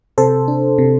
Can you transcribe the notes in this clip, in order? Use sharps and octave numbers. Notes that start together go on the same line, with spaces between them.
C3 A4 C5
D4
C3